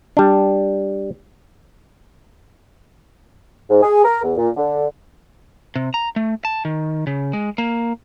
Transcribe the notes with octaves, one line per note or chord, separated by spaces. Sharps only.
G3 D4
G#2
G#4
A#4
E2
A#2
D3
C3
A#5
A3
A5
D#3
C#3
G#3
A#3